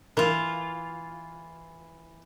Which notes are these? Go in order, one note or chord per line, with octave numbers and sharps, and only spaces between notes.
E3 F4 A#4